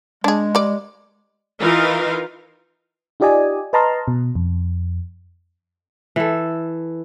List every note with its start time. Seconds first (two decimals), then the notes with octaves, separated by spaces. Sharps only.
0.24 G#3 D4 G#4
0.55 G3 D5
1.59 E3 D#4 F4 A#4 F5
3.20 D#4 F4 G4 D5 D#5 G#5
3.73 B4 D#5 A5 A#5 C6 F6
4.08 B2
4.35 F2
6.16 E3 A4